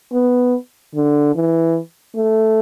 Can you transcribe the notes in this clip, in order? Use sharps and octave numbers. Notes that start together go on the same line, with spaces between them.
B3
D3
E3
A3